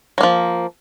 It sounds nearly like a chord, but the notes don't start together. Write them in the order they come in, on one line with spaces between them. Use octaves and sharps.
F#3 A#3 F3